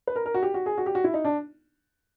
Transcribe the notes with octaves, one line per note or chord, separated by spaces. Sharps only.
B4
A#4
A#4
F#4
G4
F#4
G#4
F#4
G4
F#4
E4
D#4
D4